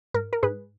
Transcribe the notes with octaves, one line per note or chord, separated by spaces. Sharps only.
G#2 A#4
A#4
G#2 G#4 B4